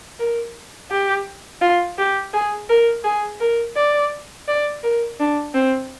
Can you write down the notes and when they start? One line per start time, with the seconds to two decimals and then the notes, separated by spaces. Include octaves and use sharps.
0.19 A#4
0.91 G4
1.61 F4
1.98 G4
2.33 G#4
2.69 A#4
3.04 G#4
3.40 A#4
3.76 D5
4.48 D5
4.83 A#4
5.19 D4
5.54 C4